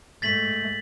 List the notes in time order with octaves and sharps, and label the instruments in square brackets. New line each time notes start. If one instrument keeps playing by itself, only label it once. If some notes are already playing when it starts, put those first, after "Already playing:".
[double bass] G#2 A3 [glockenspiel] A6 B6 F#7